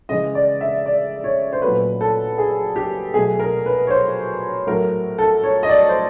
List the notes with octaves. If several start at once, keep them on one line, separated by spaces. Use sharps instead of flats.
C#3 E3 G#3 D#5
D5
E5
D5
C#5
C5
A#2 F#3 A3 B4
A4
G#4
G4
B2 F#3 A3 G#4
A#4
B4
C#5
C5
A2 F#3 A3 A#4
A4
C#5
D#5
D5
C5